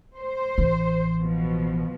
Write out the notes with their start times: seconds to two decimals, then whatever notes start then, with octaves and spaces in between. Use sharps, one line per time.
0.16 C5
0.58 A1 E3
1.21 B2 F3